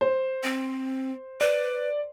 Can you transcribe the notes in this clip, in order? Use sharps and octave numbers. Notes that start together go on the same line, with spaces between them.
C5
C4
B4 D5